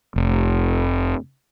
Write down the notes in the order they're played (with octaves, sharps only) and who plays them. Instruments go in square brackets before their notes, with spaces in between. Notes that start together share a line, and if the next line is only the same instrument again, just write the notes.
[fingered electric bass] F1